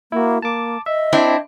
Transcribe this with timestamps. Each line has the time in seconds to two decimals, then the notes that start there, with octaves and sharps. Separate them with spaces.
0.12 A#3 E4 F#4
0.42 A#3 A5 D6
0.86 D#5 E5
1.13 C4 D4 E4